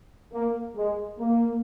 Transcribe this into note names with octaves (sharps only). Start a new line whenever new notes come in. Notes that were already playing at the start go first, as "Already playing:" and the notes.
A#3
G#3
A#3